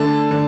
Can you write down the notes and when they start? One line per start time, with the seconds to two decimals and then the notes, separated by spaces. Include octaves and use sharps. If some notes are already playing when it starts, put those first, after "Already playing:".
Already playing: D3 A3 A5
0.31 D3